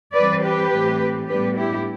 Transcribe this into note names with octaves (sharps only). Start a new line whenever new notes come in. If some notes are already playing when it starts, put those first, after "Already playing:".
E3 G3 C4 B4 D5
G4 B4
A2 E3 A3 C4
A2 G3 B3 D4 G4 B4
E4 G4